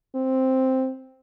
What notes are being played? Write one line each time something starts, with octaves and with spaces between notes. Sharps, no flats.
C4